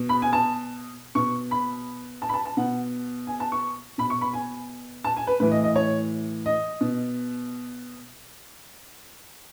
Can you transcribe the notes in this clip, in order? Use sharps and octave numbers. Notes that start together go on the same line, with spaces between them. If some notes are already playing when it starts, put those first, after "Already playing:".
Already playing: B2
B5
G#5
A5
B2 C#6
B5
A5
B5
A5
A5
B2 F#5
G#5
A5
C#6
B2 B5
C#6
B5
G#5
A5
G#5
B4
A2 E3 B4
D#5
D#5
C#5
D#5
B2